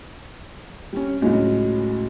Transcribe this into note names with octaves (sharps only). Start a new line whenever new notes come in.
G3 C#4
C#2 A2 F#3 G#3 C#4